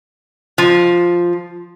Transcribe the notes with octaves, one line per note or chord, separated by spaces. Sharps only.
F3